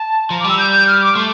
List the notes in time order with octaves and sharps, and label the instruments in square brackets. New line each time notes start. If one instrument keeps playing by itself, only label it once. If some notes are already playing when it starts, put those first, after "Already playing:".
Already playing: [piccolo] A5
[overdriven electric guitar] F3 [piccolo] A#5
[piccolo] D6
[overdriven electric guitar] G3 [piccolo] E6
[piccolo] G6
F6
D6
[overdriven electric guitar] A3 [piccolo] C6